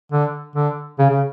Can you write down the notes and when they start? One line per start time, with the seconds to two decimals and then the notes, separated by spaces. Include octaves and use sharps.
0.12 D3
0.55 D3
0.99 C#3
1.10 C#3